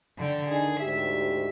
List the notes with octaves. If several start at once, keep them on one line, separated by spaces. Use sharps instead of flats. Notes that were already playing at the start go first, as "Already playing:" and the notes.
D3 G5
D#3 D4 G#4
D2 G#2 G4 E5